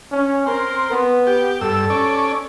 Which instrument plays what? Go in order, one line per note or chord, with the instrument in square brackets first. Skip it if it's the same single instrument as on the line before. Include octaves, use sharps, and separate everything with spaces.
[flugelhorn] C#4
[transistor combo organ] C4 [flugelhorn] A#4
[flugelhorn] B3
[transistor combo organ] G4
[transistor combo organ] G2 E6 [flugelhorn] A4
[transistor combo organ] C#4 D5